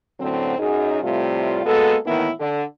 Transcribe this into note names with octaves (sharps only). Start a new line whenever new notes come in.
F#2 A2 D3 F#3 C4
F#2 D#4 G#4
A2 C3 G3 A3 F4
G#3 A#3 B3 F#4 A4
A2 D#3 E3 A#3 B3 E4
D3